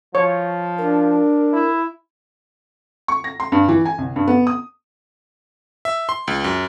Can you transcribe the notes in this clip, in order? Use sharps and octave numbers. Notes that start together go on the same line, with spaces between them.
F3 C#5
D4 A#4
E4
C#6
A#6
C6
G2
E3
G#5
C2
G2
B3
D#6
E5
C6
C#2
F#2